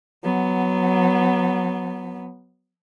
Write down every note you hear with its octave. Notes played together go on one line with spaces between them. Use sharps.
F#3 B3